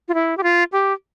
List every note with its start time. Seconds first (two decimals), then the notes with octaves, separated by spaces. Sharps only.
0.08 F4
0.14 E4
0.38 G4
0.43 F4
0.72 G4